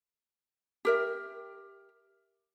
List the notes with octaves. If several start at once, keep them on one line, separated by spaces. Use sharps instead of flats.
G4 A#4 E5